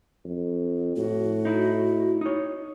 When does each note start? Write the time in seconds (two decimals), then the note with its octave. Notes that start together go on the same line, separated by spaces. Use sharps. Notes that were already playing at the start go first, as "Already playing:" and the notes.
0.25 F2
0.97 A2 F#4
1.45 D#4 E4
2.21 D#4 C#5